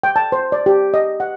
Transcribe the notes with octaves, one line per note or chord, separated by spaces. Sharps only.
G5
A5
C5
D5
G4
D#5
F#5